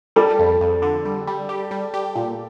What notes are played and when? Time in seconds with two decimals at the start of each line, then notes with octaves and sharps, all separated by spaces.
0.16 G3 A4
0.39 F2
0.61 F2
0.82 D3
1.05 G3
1.27 G3
1.49 G4
1.71 G3
1.94 G4
2.16 A#2